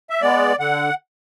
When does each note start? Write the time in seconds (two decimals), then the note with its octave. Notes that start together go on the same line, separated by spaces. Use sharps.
0.10 E5
0.21 G#3 B3 D5
0.59 D3 F#5